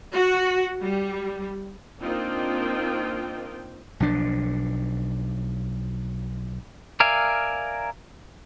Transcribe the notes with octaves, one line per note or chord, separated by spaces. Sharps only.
F#4
G3
A#3 C4 D4 D#4 F4 G5
B1 F3 D4
A#4 D5 E5 F5 G#5